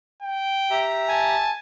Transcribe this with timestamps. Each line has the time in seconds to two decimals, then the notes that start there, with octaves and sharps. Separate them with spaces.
0.22 G5
0.70 G4 E5 A#5
1.09 G#5 A5